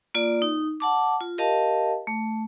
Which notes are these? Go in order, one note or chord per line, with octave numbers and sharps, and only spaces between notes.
A#3 F4 D5
D#4
F#5 A5 D6
F4
G4 A#4 D#5 F5 A5
A3